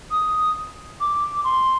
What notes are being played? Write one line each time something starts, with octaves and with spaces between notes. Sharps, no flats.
D#6
D6
C6